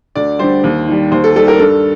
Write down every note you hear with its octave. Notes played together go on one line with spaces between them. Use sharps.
D2 D5
D3 G3 C5
D#2
D#3 G3
D#2 C5
A4
D#3 G3 A4
A#4
G2 A4